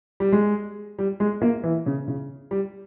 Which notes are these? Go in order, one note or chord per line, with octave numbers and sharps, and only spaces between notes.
G3
G#3
G3
G#3
A#3
E3
C#3
C#3
G3